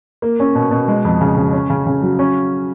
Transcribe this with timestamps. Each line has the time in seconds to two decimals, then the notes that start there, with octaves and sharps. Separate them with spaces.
0.22 A#3
0.40 C#4
0.55 B2
0.71 B2
0.88 G#3
1.05 F2
1.21 C#3
1.37 C#3
1.53 C#4
1.70 C#3
1.87 C#3
2.02 F#3
2.19 C#4